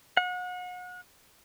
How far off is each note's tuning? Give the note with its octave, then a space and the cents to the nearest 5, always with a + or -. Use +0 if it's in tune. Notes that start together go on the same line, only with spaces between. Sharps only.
F#5 -35